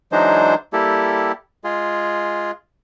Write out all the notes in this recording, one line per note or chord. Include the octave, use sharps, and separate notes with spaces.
E3 F#3 G#3 D4 D#4 C5
G3 A#3 E4 G4 A4
G#3 F4 G#4